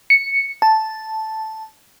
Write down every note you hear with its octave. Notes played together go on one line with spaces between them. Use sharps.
C#7
A5